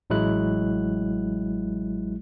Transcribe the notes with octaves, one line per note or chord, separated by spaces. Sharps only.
A1 F#3 G#3 E4 F#6